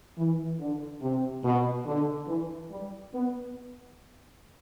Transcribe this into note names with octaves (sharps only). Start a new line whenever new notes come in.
E3
D3
C3
B2
D3
E3
G3
B3